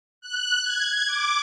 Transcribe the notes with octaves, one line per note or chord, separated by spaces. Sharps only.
F#6
G#6
D6